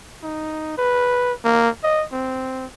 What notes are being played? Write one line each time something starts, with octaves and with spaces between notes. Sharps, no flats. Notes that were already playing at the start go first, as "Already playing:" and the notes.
D#4
B4
A#3
D#5
C4